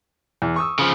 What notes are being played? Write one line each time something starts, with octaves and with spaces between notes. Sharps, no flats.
E2
C#6 D#6 E6
C#3 F3